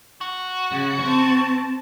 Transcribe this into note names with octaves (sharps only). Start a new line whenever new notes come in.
F#4
C#3
C4 A5